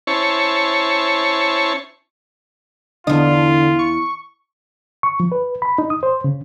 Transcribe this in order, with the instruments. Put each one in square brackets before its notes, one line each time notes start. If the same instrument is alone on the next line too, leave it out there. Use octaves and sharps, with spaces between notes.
[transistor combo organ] C#4 E4 C5 C#5 A5 C#6
[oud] E2 D#5 [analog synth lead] D3 [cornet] F4
[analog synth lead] C#6
[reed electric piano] C#6
F3
B4
B5
D#4
D#6
C5
C#3